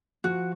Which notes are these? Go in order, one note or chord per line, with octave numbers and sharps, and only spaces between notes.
F3 F#4